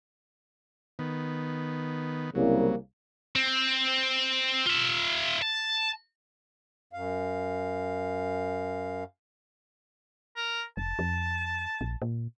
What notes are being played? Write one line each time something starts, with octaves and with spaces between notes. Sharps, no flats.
D#3 B3
C2 C#3 F#3 A#3
C4
F4 E5
A5
F#2 F5
A#4
F1 A5
F2
A#1
A#2